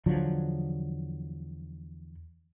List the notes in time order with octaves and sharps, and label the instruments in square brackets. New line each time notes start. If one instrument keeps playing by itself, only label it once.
[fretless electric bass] E2 D3 F3 F#3